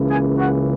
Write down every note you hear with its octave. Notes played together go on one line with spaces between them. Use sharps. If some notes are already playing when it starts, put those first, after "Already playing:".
Already playing: C#2 C#3 E3 A#3
G#4 G#5
F#4 F#5